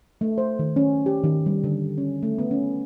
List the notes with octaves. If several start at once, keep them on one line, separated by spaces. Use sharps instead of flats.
A3
C5
D#3
C#4
G4
D#3
G3
D3
C#4
A3
B3
C#4